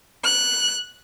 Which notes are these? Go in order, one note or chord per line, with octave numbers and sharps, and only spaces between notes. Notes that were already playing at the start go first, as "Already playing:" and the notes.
F#6